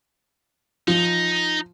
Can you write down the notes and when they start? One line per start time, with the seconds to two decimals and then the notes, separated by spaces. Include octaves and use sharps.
0.88 F3 D#4